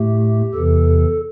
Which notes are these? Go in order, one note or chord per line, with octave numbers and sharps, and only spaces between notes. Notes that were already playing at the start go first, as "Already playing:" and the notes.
Already playing: A2 A3 G4
E2 C3 E3 A4